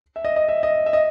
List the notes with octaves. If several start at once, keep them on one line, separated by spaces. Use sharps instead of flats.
E5
D#5
D#5
E5
D#5
E5
D#5